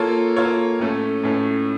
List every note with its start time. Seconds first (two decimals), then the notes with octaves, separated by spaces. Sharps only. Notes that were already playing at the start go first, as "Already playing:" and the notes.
Already playing: A#3 F4 A4 C#5
0.36 A#3 F4 A4 C#5
0.80 A2 A3 C#4 A4
1.24 A2 A3 C#4 A4